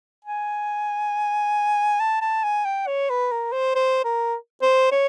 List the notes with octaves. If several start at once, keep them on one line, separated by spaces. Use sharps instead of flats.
G#5
A5
A5
G#5
G5
C#5
B4
A#4
C5
C5
A#4
C5
C#5